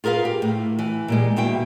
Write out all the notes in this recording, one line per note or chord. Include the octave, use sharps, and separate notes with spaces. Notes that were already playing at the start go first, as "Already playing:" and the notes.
F4 G#4 A#4 B4 F5
G4
A2
E3
A#2 G3 G#3
D#2 B2 E4 G5